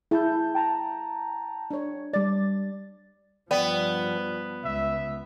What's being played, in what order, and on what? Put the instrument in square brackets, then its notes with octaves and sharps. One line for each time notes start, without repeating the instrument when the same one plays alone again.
[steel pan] E4 [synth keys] G#4 A5 G6
[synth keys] G5 A5 A#5
[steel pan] D4 C#5
[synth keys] G3 A6 [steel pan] D5
[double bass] G2 F3 [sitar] B3 [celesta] D5 G5
[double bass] C#2 [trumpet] E5